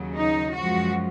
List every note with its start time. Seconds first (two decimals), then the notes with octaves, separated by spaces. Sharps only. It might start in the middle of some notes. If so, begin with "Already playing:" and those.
Already playing: D#2 C#3 F#3
0.17 D#4
0.55 F#2 F3 G#3 F#4